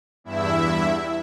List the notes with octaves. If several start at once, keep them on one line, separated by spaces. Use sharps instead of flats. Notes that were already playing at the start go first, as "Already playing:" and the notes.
E2 G2 E4 E5